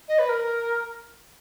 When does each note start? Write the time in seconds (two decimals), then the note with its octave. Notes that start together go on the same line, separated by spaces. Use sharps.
0.08 D#5
0.19 B4
0.29 A#4